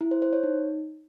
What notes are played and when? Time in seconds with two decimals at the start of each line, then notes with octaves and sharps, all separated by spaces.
0.01 E4
0.11 C5
0.22 C5
0.33 C#5
0.43 D#4